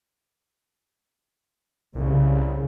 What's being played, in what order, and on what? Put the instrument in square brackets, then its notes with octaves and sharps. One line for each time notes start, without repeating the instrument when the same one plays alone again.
[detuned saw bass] C2 [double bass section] C#3